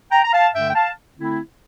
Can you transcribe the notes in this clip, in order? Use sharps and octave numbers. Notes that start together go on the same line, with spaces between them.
G5 A#5
A#5
F5 A5
G2 D3 A3 E5 G5
G5
F5 A5
D3 A3 C4 E4